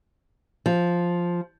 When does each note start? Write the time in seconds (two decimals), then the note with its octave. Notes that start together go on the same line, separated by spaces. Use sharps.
0.66 F3